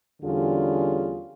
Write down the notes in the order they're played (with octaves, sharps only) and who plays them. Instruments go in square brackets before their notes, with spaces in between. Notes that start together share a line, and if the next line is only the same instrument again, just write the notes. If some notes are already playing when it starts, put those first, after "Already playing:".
[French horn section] E2 D3 G3 C#4 F4 G#4